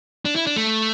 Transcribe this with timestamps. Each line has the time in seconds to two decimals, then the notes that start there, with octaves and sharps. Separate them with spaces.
0.25 D4
0.36 E4
0.47 D4
0.56 A3